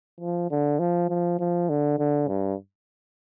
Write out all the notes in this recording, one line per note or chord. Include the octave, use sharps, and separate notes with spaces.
F3
D3
F3
F3
F3
D3
D3
G2